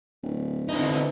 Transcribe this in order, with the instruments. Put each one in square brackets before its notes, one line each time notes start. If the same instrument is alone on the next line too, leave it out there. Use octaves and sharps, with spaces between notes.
[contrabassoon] D1
[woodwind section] B2 [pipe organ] D3 E4 [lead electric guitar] C4 D#4